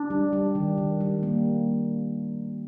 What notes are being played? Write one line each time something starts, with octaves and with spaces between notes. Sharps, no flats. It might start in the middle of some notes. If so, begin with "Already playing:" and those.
Already playing: D4
G3
G3
D#3
D#3
G3
A#3